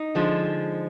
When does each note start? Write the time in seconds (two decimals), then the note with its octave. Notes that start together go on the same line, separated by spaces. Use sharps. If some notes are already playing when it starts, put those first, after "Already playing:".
Already playing: D#4
0.15 D3 F3 G#3